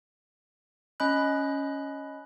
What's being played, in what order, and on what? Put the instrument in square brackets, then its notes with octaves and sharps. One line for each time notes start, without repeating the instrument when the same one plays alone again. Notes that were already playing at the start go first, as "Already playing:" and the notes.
[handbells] C#4 D#5 B5 F#6